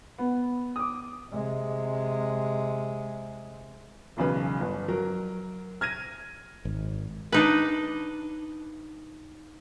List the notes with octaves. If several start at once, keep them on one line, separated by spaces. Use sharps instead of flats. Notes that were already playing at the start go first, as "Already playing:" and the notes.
B3
D6 D#6
C3 G#3
E1 B1 C#3 B4
G1
F#3 A#4
F6 G#6 A#6 D#7
G#1
D4 D#4 B4